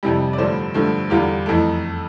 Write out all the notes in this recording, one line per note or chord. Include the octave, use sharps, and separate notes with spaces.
F2 C3 G3 E4
D5
G2 D3 F3 A3 C5
G2 D3 F3 A3
E2 D3 G3 F4
F2 E3 A3